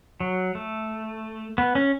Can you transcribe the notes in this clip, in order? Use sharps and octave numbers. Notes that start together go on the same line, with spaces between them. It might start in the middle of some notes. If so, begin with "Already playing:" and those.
F#3
A3
B3
C#4